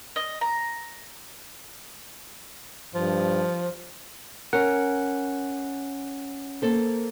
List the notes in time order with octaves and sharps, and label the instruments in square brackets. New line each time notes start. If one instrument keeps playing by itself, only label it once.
[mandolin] D#5
A#5
[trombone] G2 [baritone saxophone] F3
[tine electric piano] C#4 F#5 [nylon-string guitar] A#4
[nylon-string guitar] A#3 A4 C5